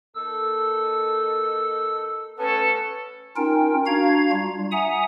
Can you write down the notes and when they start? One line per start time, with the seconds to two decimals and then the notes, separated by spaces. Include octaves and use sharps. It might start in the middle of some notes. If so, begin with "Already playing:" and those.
0.15 A#3 D#4 A4 E6
2.38 A3 B3 C#4 A4 B4
3.36 C#4 D#4 F4 A#4 G5
3.86 D4 F#4 F5 A#5 G#6
4.31 G3 F4
4.72 E5 F#5 G#5 A#5 D#6